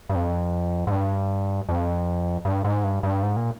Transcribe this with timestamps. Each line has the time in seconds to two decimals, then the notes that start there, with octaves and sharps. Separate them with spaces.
0.09 G2
0.15 F2
0.87 G#2
0.92 G2
1.69 F2
2.45 G2
2.64 G#2
2.84 G2
3.03 G2
3.23 G#2
3.36 A#2